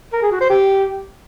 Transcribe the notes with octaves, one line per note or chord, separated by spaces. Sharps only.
A#4
G#4
F#4
C5
G4